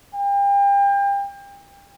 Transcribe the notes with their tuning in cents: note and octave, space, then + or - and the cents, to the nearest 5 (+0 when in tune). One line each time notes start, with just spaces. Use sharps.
G5 +35